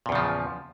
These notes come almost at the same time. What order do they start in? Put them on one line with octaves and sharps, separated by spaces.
A#2 E2 C#3 F3